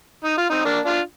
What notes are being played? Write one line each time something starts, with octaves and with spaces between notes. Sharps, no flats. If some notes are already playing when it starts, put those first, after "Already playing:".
D#4
F4
C4 D#4
A#3 D4
D4 F4